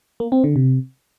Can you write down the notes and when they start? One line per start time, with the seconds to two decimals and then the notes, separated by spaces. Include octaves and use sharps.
0.20 A#3
0.32 C4
0.44 D3
0.56 C3